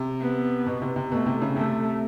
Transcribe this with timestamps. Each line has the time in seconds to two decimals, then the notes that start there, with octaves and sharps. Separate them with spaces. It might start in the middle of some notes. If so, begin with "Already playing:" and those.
Already playing: C3
0.21 B3
0.66 B2
0.82 C3
0.96 C3
1.12 B2 A3
1.26 C3
1.41 C#3
1.56 C3 A3